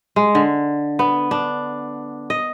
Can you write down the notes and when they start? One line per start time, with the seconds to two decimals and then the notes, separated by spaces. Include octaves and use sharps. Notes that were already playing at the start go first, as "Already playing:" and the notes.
0.16 G#3
0.35 D3
0.99 B3
1.31 D4
2.30 D#5